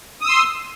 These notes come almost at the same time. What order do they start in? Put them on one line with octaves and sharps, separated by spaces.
D#6 E6 C6